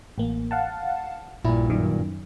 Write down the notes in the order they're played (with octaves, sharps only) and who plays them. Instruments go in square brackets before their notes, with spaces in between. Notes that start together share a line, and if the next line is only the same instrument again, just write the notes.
[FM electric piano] A1 A#3
F5 F#5 A5
[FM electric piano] A#1 E4 [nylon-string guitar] G2 A#2
[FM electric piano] F#2 D#3